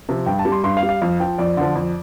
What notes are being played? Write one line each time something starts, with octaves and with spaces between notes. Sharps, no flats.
C3 F3
G2 G5
A5
G3
C6
G2 C6
F5
G3
F5
F2 F5
F3 G5
F2 D5
D3 F3
F2